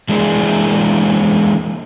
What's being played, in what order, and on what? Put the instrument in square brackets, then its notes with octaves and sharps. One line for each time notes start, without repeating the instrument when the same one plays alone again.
[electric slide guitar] E3 G#3 A#3 D4 E4 G#4